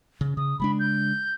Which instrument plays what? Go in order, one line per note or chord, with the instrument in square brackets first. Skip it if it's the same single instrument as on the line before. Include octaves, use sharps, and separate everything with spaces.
[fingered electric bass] C#3
[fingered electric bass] C#3 [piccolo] D#6
[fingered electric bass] C#3 G#3 D4 [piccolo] B5
[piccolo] G6